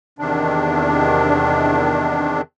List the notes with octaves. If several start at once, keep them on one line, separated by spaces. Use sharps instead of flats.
E2 C3 D#3 D4